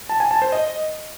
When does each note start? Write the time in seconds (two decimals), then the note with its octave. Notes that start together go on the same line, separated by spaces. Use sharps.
0.09 A5
0.20 G#5
0.31 A5
0.42 C5
0.52 D#5